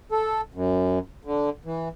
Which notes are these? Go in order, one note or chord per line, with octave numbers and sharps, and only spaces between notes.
A4
F#2
D3
E3